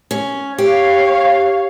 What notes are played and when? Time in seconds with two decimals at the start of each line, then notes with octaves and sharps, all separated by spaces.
0.11 C#4
0.58 G4 C#5 F5